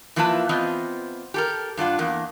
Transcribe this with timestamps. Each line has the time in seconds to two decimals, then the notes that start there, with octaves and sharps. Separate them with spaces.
0.16 E3 F3 A#3 E4 B4 A5
0.49 E3 B3 C4 F4 D#5
1.34 G4 A4 A#4
1.77 G2 D4 F4 F#5
1.99 E2 A#3